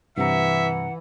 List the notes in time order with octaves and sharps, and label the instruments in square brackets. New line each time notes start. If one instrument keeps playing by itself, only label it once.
[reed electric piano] G2 C3 A#5 [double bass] E3 [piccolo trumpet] E5 [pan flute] F#5